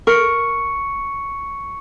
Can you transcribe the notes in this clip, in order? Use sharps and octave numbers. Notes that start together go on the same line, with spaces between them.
A#4 C#6 C#7